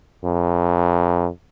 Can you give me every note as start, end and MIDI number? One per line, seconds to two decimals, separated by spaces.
0.24 1.28 41